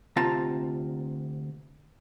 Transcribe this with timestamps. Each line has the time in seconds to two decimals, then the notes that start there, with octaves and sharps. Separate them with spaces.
0.16 D2 C3 F4 A5 A#5